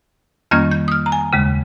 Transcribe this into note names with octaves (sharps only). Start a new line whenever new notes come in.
F2 D#3 G3 A#3 C#4 F6
G6
D#6
F6
A#5
G#5
D#2 C#3 G#3